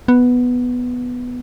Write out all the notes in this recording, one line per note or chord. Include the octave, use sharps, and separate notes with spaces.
B3